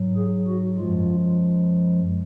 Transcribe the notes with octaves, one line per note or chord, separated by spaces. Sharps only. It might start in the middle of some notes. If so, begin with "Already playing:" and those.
Already playing: G#2 F#3
G#4
F#4
F#2 F3 G#3 F4